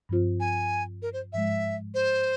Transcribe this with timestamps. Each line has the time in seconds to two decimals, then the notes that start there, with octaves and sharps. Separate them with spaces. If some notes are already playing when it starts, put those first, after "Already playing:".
0.09 G2 F3 C4 F4 C5
0.40 G#5
1.02 A#4
1.13 C5
1.33 G#2 F3 G#3 E5
1.94 C5